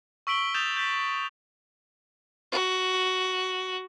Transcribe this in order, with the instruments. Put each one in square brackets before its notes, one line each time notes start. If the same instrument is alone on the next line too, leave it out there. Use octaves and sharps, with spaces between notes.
[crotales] C#6 E6 B6 D7 F#7 G7
D#6 G6 A6 E7 F7
G6 A6 B6
[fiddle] F#4